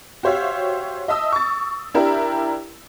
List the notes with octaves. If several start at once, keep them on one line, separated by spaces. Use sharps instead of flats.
F#4 G4 C5 C#5 E5 F5
D#5 E5 A5 D#6 E6
C#6 A6
D4 E4 G4 A#4